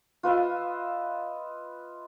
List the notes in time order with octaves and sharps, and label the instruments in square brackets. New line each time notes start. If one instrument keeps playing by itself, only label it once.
[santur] F4 B4 D#5 E5